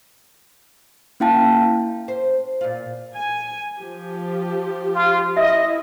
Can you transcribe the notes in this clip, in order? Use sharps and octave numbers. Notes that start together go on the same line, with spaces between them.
A#3 C#4 E4 F5 G5 A5
C5
A#2 F4
G#5
F3 G4
F4
E4 D#5 E5